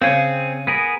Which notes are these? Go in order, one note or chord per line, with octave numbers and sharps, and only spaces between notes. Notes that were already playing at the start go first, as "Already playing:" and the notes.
C#3 C4 G#4
B3 G#4 A#4